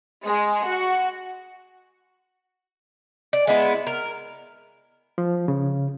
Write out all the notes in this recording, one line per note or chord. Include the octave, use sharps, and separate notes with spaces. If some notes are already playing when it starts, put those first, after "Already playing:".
G#3
F#4
D5
G#3 B3 E4
A#4
F3
C#3